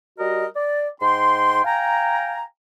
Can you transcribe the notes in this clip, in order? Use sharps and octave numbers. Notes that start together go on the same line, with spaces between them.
G3 F#4 A#4 D#5
D5
G#2 G5 C6
F5 G5 G#5 A#5